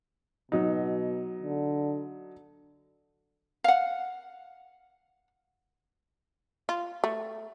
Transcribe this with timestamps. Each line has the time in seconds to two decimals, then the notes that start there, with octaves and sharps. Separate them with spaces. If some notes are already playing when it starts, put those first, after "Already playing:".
0.52 B2 F#3 D#4
1.43 D3
3.64 F5 F#5
6.69 F4
7.04 A3